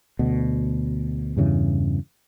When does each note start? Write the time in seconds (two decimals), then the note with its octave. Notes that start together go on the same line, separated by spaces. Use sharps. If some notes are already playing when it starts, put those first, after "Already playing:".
0.19 D2 B2
1.36 E2 G2 C#3 E3